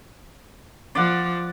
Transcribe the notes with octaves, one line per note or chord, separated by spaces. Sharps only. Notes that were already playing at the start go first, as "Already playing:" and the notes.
F3 D5 F#5